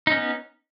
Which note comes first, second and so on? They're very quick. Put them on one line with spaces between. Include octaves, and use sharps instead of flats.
D#4 C#4 B3